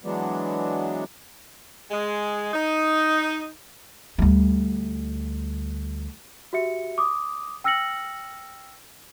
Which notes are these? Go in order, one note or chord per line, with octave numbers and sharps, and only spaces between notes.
E3 F#3 G#3 B3 D4
G#3
D#4
D2 G3
F#4 G4 E5 C#7
D6 D#6
G5 E6 F6 A#6 C#7 F#7